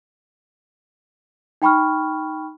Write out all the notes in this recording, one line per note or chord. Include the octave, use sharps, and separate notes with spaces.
D#4 G5 B5 C#6 F6